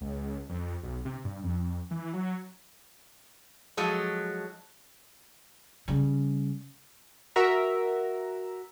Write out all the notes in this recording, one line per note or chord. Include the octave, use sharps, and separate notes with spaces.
C#2
F2
B1
C3
G2
F2
E3
F#3
F3 F#3 G#3 A4
C#3 G3
F#4 A#4 E5 A#5